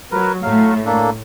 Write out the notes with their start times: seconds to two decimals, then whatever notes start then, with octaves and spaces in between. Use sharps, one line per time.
0.11 F#3 A#4 B4
0.43 A2 F#3 A3 F5
0.86 A#3 D4 A4